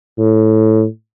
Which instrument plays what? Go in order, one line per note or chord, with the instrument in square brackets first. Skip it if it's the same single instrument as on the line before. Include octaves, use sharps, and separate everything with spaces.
[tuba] A2